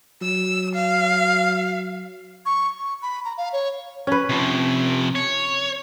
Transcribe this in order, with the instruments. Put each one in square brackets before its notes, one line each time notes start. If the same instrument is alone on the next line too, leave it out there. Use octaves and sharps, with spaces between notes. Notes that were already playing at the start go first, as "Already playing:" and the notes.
[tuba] F#3 [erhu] E6
[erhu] F5
[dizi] C#6
C#6
B5
A#5
F5
C#5
[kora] C#4 B4
[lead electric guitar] C3 F3
C#5